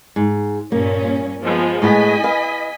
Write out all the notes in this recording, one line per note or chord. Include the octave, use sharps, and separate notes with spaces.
G#2
G2 A#2 A#3 C#4
F3 G#3 B3
A2 G#3 B3 D#5 G#5 B6
B4 F5